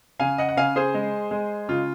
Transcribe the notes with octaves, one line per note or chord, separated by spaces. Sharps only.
C#3 F5 G#5
D#5 F#5
F#5
C#3 F5 G#5
G#4 C5
G#3
G#3
C#3 F4